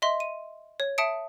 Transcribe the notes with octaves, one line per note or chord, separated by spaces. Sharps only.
D#5 E5 C6
D#7
C#5
E5 A5 D#6 C#7 D7